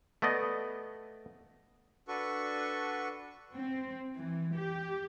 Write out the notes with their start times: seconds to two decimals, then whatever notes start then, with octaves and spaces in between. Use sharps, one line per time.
0.22 A3 B3 D5 D#5
2.08 D4 F#4 A4 B4 C#6
3.54 C4
4.15 E3
4.56 G4